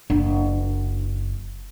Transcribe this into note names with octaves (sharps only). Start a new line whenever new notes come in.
F#1 D4